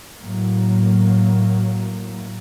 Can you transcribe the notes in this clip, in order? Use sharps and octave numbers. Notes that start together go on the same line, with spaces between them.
A2 F#3 A#3